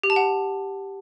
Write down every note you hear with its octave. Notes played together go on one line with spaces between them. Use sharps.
G4
A5
F#5